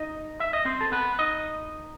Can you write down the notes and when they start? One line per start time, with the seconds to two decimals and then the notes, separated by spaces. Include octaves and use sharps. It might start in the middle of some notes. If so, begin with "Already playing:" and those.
Already playing: D#4 D#5
0.40 E5
0.53 D#5
0.65 C4 C5
0.81 A4
0.92 B3 B4
1.19 D#4 D#5